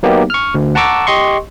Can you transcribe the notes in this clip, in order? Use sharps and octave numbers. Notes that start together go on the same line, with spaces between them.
F#3 A#3 B3 D#4 G4
C#6 F6
D2
F#5 A5 A#5 C#6 D6 E6
G4 D#5 C6 C#6